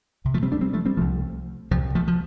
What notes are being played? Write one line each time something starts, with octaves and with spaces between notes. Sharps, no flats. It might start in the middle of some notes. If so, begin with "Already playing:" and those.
D2 C3
F3 A3
G3 C4
A3 D4
G3 C4
F3 A3
G3 C4
C2 C3 F3 A3
C2 C3 F3
F3 A3
F3